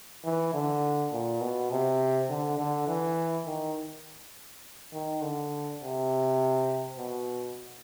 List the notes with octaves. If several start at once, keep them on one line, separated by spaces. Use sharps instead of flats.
E3
D3
A#2
B2
C3
D3
D3
E3
D#3
D#3
D3
C3
B2